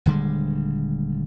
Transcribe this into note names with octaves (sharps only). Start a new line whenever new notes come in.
D#1 D3 G3 G#3